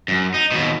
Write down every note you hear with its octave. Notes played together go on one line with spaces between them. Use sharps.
F#2
D#4
D#2 B2